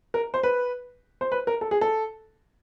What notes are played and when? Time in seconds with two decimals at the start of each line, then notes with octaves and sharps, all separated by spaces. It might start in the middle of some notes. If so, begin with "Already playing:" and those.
0.14 A#4
0.34 C5
0.43 B4
1.21 C5
1.32 B4
1.47 A#4
1.61 A4
1.71 G#4
1.81 A4